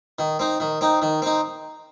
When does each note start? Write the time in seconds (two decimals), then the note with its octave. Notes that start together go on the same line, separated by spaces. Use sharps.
0.19 D#3
0.39 C4 D#4
0.60 D#3
0.81 C4 D#4
1.02 D#3
1.22 C4 D#4